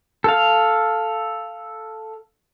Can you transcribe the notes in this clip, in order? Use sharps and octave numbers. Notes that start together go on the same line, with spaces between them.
A4 F5